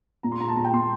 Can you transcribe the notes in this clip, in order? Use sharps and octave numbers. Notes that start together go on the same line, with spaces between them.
A#2 A#5
C6
A#2 A#5
A5
A#2 A#5
G5
A#2 C6